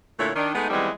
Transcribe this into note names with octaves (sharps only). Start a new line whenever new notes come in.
A#2 D3 A3 E4 C#5
D#3 D4
G#3 A3 B3 D#4
D#3 E3 G3 G#3 B3 C4